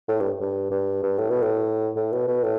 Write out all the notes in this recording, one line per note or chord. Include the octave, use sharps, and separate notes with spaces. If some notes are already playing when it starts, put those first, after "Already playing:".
A2
G2
G2
G2
G2
A2
B2
A2
A2
B2
B2
A2